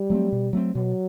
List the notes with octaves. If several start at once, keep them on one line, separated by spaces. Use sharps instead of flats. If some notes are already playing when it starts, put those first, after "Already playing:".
Already playing: G3
F#3 A3 C4
B2
F#3 A3 C4
B2 F#3